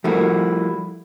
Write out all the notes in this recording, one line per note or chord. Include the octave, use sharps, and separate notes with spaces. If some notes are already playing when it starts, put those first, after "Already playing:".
F3 G3 A3 A#3 E4 F#4